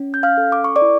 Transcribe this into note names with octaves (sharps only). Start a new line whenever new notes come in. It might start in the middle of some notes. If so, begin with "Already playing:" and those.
Already playing: C#4
G6
F5 F6
A4
D6
C#6
D5 D6
E4